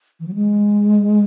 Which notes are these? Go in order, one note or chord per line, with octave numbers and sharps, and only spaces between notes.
E3
F#3
G#3